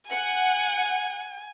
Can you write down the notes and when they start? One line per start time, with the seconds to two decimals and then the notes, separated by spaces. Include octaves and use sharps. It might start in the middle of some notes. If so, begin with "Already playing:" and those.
0.10 F#5 G#5